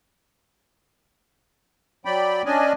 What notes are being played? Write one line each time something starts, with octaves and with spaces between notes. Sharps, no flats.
F#3 D5 G5 B5
C#4 D4 D5 D#5 G#5